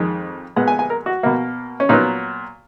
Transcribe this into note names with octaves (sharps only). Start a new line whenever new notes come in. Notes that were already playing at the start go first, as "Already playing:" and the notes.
Already playing: F2 D#3 G#3
A#2 G#3 B3 F#5
G#5
G#5
A#4
F#4
B2 A#3
C#4
A#2 F#3 B3 D#4